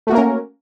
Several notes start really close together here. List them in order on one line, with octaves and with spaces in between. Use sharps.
A3 F#4 A#3 A#4 C#4